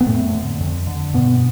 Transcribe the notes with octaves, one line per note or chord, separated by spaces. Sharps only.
B3
F2 A2 A3
D3
F2
D3
G2 B2 B3